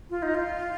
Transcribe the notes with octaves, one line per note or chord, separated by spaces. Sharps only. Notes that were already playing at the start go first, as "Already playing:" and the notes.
F4
D#4
F4